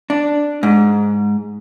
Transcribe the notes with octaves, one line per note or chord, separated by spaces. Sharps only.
D4
G#2